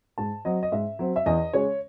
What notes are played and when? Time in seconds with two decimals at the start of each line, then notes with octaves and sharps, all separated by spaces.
0.18 G#2 A5
0.45 F#3 C4 D#5
0.63 D#5
0.72 G#2 E5
0.99 F#3 C4
1.16 E5
1.26 E2 D#5
1.53 C#3 G#3 C#5